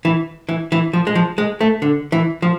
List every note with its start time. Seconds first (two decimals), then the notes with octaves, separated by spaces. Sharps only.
0.05 E3
0.49 E3
0.72 E3
0.93 F3
1.07 G#3
1.15 F3
1.38 G#3
1.61 A3
1.82 D3
2.12 E3
2.42 F3